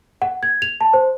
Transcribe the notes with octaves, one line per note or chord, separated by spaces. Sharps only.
F#5
G#6
F7
A5
C5